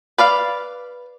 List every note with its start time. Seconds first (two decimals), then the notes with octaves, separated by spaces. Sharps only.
0.18 B4 D5 F5